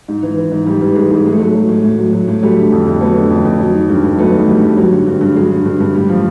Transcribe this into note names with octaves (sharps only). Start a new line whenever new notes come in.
G#2
E3
E3
G#2
G#2 G3
E3 G3
E3 G#3
G#2 G#3
A2 G#3
A3
F#3 G#3
F#3
A2
A2
F#3
F#3
A2
F#3 G3 A3
D3
F2
F2
F#3 A3 B3
D3
F2
F2
F#3
D#3
G2
G2
F#3 A3 B3
D#3
G2 G3 A3
G2
F#3 G3
D3
G2
G2
F#3 G#3
D3
G2
G2
A2 G3
F3